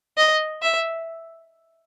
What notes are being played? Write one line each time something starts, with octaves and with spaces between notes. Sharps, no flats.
D#5
E5